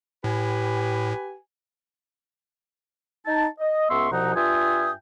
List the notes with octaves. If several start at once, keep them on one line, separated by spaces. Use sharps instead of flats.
A2 G4 B4 G#5
D#4 A5
D#5
C#2 B3 E5 C6 C#6 E6
C2 B2 F3 D#4 F#5 A#5
G2 F4 E5 G5 G#5 D#6